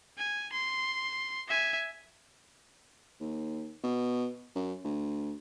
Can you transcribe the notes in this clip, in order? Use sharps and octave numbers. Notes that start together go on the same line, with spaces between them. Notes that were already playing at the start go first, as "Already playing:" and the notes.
G#5
C6
E5 G#5
D#2
B2
F#2
D2